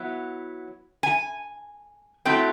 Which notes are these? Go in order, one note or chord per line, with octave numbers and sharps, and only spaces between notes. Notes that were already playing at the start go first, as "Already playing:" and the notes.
Already playing: F#3 B3 E4
G#5
F#3 A3 C4 E4 G5